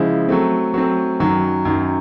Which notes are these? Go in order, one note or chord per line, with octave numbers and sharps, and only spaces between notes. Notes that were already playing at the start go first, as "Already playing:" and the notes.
Already playing: C#3 F3 G#3 E4
F#3 A3 C4
F#3 A3 C4
F#2 D#3 F#3
F#2 D#3 F#3